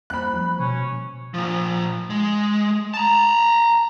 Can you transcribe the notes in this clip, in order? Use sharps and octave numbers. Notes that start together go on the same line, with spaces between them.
G3 A#3 C5 B5 F#6
F3
B2 C#4
A#2 F3
G#3
A5 A#5